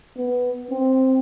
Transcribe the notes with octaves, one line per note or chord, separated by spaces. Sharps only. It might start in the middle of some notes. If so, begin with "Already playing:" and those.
B3
C4